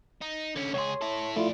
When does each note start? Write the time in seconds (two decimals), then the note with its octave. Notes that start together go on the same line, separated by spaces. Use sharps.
0.21 D#4
0.56 D3 C#4
0.74 C#2 G#4 C#5 C6
1.01 E4 A4
1.36 F3 A3 E4 F4 D5